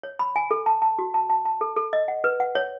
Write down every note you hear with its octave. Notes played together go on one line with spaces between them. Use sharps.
C#5
B5
G#5
A4
A5
A5
F#4
A5
A5
A5
A4
A4
D#5
F#5
B4
F#5
C#5